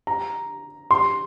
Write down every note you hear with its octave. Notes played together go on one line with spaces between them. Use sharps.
A#5
C6